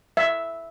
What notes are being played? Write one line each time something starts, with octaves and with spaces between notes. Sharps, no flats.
E5